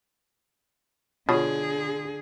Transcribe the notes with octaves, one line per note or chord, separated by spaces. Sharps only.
B2 D3 F4 G#4 C#5